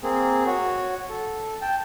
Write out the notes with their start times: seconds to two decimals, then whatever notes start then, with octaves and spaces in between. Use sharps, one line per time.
0.03 A#3 C4 G#4
0.46 F#4 C#5
1.09 A4
1.61 G5 A5